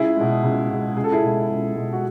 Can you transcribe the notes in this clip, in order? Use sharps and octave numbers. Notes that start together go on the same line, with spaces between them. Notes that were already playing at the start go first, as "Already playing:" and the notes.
Already playing: C#2 E4 G#4
B2 G#3
C#2
B2 G#3
C#2 G#4
A4
E4 G#4
B2 G#3
C#2
B2 G#3
F#4